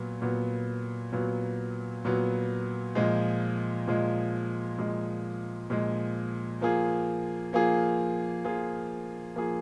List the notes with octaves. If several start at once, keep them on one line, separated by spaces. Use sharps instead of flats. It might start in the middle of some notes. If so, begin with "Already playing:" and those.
Already playing: A#2 F#3 B3
A#2 F#3 B3
A#2 F#3 B3
A#2 F#3 B3
A#2 F3 G#3
A#2 F3 G#3
A#2 F3 G#3
A#2 F3 G#3
F3 A#3 F4 G#4
F3 A#3 F4 G#4
F3 A#3 F4 G#4
F3 A#3 F4 G#4